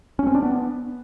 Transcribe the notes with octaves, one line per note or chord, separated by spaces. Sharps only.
C#4
C4
D4
B3